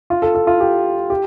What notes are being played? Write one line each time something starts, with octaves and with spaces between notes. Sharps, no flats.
F4
A4
A4
F4
G4
G4